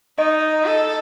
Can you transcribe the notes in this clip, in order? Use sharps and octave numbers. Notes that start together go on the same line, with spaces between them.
D#4 D#5
A4